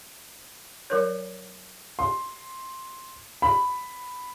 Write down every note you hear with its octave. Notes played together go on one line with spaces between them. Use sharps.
F#3 A#4 C#5
C6
B5